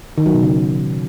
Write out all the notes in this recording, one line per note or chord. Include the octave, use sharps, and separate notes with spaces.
D#3
F#3
B2
C#3